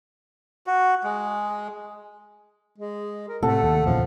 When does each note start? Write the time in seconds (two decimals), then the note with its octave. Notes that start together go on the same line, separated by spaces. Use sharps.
0.67 F#4
1.04 G#3
2.79 G#3
3.29 A#4
3.43 A2 C3 A3 A4 F#5
3.63 D#2
3.86 A#1 E2 C#3 F3